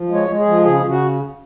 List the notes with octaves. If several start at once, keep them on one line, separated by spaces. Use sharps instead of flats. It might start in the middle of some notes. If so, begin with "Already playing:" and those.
Already playing: F3
G#3
C#5
G#3
G#4
F3
C#3 G#4
C#3
F#4